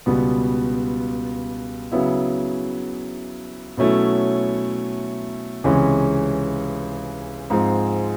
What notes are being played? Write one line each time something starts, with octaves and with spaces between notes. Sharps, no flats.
C#2 B2 G3 B3
C#3 F#3 B3 E4
B2 F#3 A3 C#4 E4
C#2 C3 E3 G#3 C#4
G#2 F3 G#3 C4